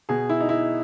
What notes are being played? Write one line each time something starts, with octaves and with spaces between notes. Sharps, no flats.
B2 G#4
E4
D#4
E4